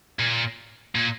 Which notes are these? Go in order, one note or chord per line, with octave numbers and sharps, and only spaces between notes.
A#2
A#2